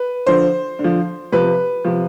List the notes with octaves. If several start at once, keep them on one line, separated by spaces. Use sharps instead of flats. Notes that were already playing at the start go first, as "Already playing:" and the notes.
Already playing: B4
D3 F3 C5
D3
F3
C3 F3 B4
C3 F3